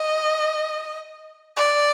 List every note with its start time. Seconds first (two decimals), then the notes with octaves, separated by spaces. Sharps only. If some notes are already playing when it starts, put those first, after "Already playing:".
Already playing: D#5
1.57 D5